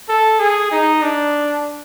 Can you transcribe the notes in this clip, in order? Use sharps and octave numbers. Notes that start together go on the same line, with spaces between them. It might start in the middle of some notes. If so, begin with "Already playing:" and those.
A4
G#4
D#4
D4